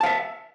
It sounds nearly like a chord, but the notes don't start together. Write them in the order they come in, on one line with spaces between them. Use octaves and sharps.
A5 F5 E5